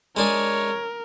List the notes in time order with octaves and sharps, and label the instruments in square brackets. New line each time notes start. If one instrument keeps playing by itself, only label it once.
[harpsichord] G#3 D4 G#4 [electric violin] A#4 [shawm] C#5